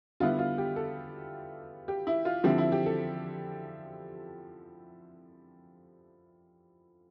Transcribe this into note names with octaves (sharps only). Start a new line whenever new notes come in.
D3 G3 B3 E4 F4
F4
G4
A4
G4
E4
F4
D3 F3 C4 E4 G4
E4
G4
A4